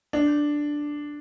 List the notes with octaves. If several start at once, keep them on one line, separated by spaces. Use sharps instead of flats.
D4